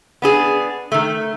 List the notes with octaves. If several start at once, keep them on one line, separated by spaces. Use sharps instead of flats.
B3 D4 G#4
D#3 A3